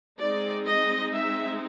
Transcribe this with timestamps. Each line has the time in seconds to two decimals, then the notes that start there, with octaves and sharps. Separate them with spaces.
0.19 G#3 C4 D#4 D5
0.66 D#5
1.13 E5